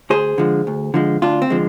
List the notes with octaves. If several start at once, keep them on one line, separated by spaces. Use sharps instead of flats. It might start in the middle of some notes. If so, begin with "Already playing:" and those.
D2 G#4 C5
D3 F3 G#3
D2
D3 F3 G#3
D2 D4 F4
C4
D3 F3 G#3